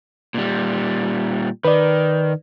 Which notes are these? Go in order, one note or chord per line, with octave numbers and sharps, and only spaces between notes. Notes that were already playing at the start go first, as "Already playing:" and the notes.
A#2 G3
D#3 B4 D5